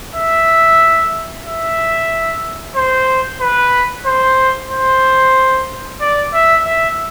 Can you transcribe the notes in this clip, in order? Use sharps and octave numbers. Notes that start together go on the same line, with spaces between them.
E5
E5
C5
B4
C5
C5
D5
E5
E5